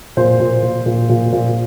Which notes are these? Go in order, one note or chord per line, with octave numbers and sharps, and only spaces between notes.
A#2 C5
A#2
A#2
A#2
A#2
A#2